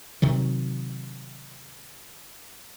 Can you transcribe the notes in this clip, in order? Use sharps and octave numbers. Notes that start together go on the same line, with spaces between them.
C3 D#3 F#3